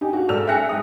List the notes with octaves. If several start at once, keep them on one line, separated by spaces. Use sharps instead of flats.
D#4 G4 G#5
F#4 F5
G#2 A4 D5 E6 F6 F7
E5 G5 G#5 F#6 A#6 C#7
G#2 D#6